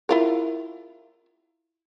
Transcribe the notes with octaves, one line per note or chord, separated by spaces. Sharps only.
E4 F4 A#4